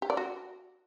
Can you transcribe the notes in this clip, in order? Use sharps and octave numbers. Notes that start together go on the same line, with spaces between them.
G4
D5
F#4